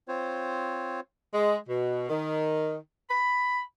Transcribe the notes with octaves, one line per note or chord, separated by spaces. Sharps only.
C4 F4 C5 C#5
G#3
B2
D#3
B5